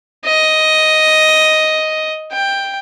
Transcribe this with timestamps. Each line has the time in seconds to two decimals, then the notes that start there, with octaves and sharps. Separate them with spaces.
0.25 D#5
2.32 G5